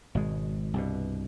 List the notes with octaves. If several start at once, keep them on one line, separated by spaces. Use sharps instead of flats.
G#1 B2 G#3
C2 G2 B2